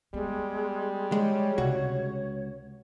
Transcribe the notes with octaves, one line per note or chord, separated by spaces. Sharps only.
G3 G#3 B3
G#3 C#5
C#2 C3 F#4